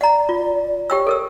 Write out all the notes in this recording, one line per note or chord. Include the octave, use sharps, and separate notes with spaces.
D5 F#5 A#5
F4
G4 C#5 G5 E6
A4 A#4 E6